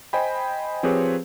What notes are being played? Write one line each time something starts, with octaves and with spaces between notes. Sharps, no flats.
C5 D#5 G5 G#5 B5
F3 C4 G4 G#4 B4 C#5